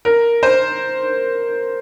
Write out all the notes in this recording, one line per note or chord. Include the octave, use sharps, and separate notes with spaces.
A#4
C5